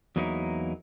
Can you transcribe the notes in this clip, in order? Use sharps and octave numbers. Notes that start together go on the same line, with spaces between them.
E2 F#3 A#3 D#4 E4